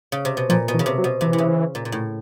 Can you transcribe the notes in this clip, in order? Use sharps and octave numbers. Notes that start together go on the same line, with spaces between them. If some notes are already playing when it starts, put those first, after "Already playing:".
C#3
C3
B2
A#2 F3
B2
E3
C#3
C3
F#3
B2
C3 E3
C3
C#3
A#2
A#2
A2